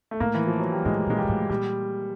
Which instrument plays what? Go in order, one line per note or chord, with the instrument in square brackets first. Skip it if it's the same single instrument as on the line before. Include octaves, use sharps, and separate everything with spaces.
[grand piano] A3
[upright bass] A2 [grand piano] A#3
[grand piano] E3
F3
F#3
G3
[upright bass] A2 [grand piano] G#3
[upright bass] A#2 [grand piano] G#3
[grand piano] G3
[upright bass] A#2
A2
[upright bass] A#2 [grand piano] G3